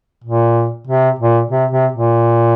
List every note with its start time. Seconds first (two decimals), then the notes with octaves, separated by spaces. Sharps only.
0.24 A#2
0.87 C3
1.19 A#2
1.51 C3
1.71 C3
1.92 A#2